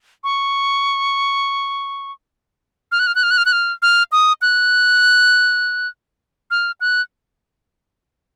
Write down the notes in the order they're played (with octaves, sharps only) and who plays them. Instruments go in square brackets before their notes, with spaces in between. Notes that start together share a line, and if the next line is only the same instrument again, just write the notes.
[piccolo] C#6
F6
F#6
F6
F#6
F6
F#6
F6
F#6
F6
F6
D#6
F#6
F6
F#6